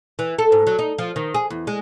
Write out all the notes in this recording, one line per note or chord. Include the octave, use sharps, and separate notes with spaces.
E3
A4
G#2
F#3
D#4
F3
D#3
G#4
E2
G#3